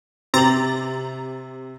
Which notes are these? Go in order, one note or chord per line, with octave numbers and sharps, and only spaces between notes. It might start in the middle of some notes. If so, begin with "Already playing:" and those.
C3 C4 A#5 D6 A6 F#7